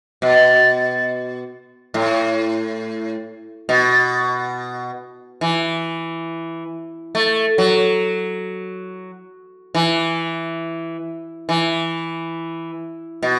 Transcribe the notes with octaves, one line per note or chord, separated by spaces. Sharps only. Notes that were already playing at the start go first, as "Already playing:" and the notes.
B2
A2
B2
E3
A3
F#3
E3
E3
B2